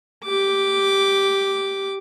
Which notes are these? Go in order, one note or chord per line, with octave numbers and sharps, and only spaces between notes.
G4 D6